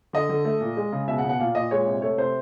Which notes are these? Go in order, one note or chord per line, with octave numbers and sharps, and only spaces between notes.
D3 D#5
D3
A3
A#2
G#3
C#3
B2 E5
F#5
B2
F#5
A#2 F5
A#2 D#5
G#3 C#5
C3
A3 C#5
C3 C5